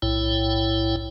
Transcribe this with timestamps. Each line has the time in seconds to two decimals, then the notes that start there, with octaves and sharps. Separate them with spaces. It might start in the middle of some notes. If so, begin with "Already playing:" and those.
0.02 B1 A2 E4 C#5 G5